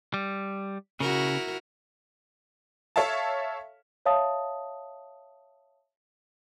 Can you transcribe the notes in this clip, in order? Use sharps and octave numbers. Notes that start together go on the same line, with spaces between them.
G3
C#3 E4 F#4 A#4
A4 C#5 E5 F5 A5
C#5 E5 F5 A5 D#6 A6